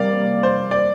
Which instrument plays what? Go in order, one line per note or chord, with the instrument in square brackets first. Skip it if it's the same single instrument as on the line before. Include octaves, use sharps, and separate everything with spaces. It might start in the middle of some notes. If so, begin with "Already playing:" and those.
Already playing: [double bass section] C3 G3 A#3 [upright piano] D5 F5
[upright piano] C5
D5